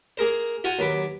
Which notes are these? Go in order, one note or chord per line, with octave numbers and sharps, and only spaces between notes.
A#3 G#4 A#4 C5
F4 F#4 F#5 G#5
D#2 F#3 B4 D6